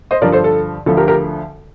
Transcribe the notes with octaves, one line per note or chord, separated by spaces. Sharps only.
C5 D#5
G2 D3 F3 A#4 D5
A4 C5
A4
D2 D3 F3 A4
G4 A#4
G4 A#4